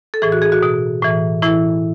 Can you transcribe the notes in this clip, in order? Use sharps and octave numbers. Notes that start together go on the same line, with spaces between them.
A4
A2 E3 G#4
F#4
G#4
F#4
B2
A2 E3
A2 E3 E4